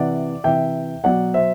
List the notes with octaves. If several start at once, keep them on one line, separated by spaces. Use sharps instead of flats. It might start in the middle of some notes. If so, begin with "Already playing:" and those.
Already playing: C3 E3 D5 F#5
C3 E3 E5 G5
B2 F#3 D5 F#5
C5 E5